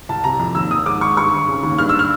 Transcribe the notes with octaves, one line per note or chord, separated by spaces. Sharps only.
C2 A5
C3 A#5
F2
D#2 E6
E1 D#6
G#2 D6
G#1 C#6
G2 C#6
G#1
C#3
D#2
G2 F6
E6
F6